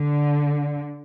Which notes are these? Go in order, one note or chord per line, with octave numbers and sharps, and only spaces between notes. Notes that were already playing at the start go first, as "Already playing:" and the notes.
Already playing: D3